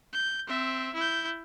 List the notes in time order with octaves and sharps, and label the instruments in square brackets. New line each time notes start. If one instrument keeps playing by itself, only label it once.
[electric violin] G6
C4 E5
E4 G6